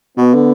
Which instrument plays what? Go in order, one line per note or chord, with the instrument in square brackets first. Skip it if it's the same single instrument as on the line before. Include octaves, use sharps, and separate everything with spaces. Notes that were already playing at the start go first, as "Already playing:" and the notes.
[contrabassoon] B2 [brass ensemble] B3
[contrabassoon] D3